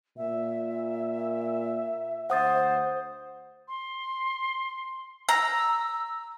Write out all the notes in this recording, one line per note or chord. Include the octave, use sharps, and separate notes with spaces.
A#2 E5
D2 C5 F#5 D#6 A6
C6
A#5 E6